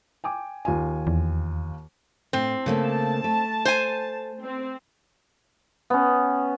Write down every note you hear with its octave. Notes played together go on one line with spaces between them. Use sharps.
G5 G#5 D6
D#2 F4 G#5
E2
A2 C4
C#3 A3 A#3 A5
A3
C5 G#5
C4
B3 C#4